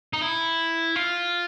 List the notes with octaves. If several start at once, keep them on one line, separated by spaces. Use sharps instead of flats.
D#4
E4
F4